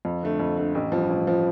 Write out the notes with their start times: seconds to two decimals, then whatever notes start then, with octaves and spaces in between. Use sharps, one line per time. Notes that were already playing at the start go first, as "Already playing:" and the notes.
0.05 F2
0.23 D3 A3
0.40 F2
0.57 D3 A3
0.75 A1
0.92 G2 F3
1.09 A1
1.27 F3